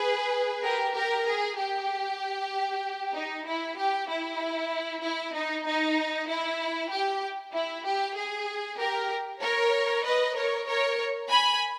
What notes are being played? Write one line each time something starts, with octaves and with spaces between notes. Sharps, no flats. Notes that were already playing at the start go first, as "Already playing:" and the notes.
Already playing: G#4 B4
G4 A#4
G4 A#4
G#4
G4
D#4
E4
G4
E4
E4
D#4
D#4
E4
G4
E4
G4
G#4
G4 A#4
A#4 C#5
B4 D#5
A#4 C#5
A#4 C#5
G#5 B5